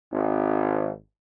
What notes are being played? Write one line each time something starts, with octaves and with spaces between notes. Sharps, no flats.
G#1